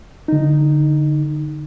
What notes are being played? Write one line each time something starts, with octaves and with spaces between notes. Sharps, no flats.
D3 D#4